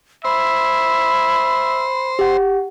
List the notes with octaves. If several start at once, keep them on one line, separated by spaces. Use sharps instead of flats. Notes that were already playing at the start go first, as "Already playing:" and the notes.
C5 E5 B5
G4 F#5